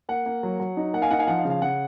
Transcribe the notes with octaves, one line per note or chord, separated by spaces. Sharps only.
A#3 F#5
A#3
F#3
F#3
D#4
A#3 F#5
F5 G#5
D#4 F#5
F5 G#5
F3 F#5
F5
C#3
F5
C#3 F#5